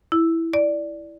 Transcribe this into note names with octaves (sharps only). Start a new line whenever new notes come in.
E4
D5